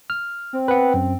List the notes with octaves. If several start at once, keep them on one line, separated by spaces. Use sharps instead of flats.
F6
C4
B4 F#5
F#2